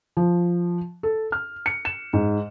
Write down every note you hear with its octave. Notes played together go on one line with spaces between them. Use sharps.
F3
A4
F6
C#7
E7
G#2